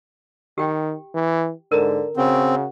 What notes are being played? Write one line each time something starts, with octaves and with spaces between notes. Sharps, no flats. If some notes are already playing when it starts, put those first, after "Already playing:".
D#3 G4 G5
E3
G#2 D3 A#4 A#5
C#3 C4 F#4